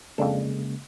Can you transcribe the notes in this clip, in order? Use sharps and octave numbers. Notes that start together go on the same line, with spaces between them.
F2 C#3 G#3 A#3 D4 A4